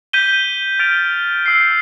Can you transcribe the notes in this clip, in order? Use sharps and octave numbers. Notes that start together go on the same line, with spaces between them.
G6 B6 D#7 G7
F6 A6 D7 F7
E6 G6 C7